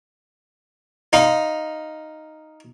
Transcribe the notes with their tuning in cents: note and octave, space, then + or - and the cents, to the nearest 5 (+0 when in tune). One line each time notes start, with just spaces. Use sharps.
D#4 +0 F5 +0 C6 -45